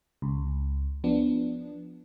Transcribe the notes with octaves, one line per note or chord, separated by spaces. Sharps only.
C#2
F3 B3 D4